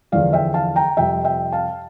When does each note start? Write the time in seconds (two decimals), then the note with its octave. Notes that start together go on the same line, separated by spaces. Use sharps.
0.12 E2 D3 F3 D5 F5
0.33 E5 G5
0.54 F5 A5
0.76 G5 A#5
0.97 F2 C3 G3 E5 G5
1.24 E5 G5
1.52 F5 A5